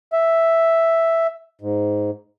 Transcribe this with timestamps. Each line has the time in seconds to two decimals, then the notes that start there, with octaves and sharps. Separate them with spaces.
0.13 E5
1.61 G#2